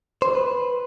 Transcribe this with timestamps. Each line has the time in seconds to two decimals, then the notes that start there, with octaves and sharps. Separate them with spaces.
0.22 C5
0.35 B4